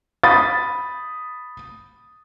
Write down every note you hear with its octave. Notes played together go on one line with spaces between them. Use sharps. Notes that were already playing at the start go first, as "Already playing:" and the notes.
B5 D#6 A6